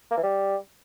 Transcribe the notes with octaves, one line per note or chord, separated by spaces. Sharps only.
A#3
E3
G3